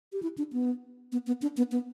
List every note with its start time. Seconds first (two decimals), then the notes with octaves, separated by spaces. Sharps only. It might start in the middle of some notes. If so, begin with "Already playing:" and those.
0.13 G4
0.23 E4
0.38 D4
0.53 B3
1.12 B3
1.27 B3
1.42 D4
1.57 B3
1.72 B3